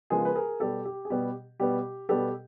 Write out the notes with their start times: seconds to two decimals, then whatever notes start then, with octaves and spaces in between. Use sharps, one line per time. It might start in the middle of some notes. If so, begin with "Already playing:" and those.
0.10 C#3 F3 G#3 B3 G#4 A#4
0.25 B4
0.35 G#4 A#4
0.60 B2 G3 B3 G4 A4
0.85 G4
1.05 G#4
1.10 B2 G3 B3 G4
1.60 B2 G3 B3 G4
2.09 B2 G3 B3 G4 A4